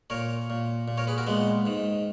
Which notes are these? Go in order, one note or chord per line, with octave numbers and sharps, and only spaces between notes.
A#2 A#4 C#5
A#2
A#2
A#4 C#5
G#4 B4
F#4 A#4
A#2 G#3 B3
G#2 D#3